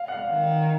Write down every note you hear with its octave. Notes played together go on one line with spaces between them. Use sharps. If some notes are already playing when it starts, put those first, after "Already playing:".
Already playing: F5
F#5
F5
D#3